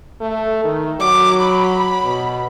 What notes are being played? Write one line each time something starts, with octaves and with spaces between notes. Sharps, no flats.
A3
D#3
F#3 D6
B5
B2